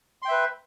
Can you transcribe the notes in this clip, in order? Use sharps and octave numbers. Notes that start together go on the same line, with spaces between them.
B4 E5 G5 C6